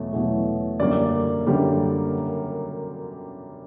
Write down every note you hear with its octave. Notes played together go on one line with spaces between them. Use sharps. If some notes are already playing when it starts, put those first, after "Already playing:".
Already playing: E2 B2 F#3 A3
E2 B2 F#3 A3
F#2 D3 G3 A#3 D5
F#2 D3 G3 A#3